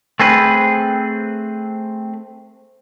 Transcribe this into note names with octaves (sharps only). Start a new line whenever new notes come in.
A3 C4 G#4 B4